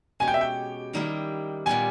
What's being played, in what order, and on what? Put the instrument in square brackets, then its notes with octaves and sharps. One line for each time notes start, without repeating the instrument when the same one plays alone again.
[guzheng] B2 G#3 C#4 G4 [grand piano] G#5
[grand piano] G5
E5
G5
[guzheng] D#3 G3 A#3 E4 G4
[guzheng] A#2 G3 B3 G4 [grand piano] G#5